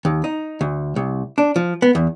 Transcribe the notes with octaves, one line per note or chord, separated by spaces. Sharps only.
D#2
D#4
D2
C2
D4
F3
B3
E2